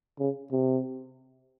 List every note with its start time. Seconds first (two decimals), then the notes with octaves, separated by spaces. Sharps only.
0.19 C#3
0.51 C3